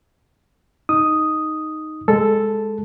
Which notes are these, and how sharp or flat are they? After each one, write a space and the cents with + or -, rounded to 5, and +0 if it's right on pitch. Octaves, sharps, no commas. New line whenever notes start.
D#4 +0 D#6 +0
G#3 -10 A4 +0